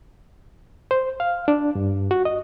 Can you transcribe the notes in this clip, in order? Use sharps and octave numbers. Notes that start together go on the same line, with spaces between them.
C5
F5
D4
G2
F#4
D#5